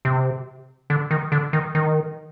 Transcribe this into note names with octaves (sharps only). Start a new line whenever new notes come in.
C3
D3
D#3
D3
D#3
D#3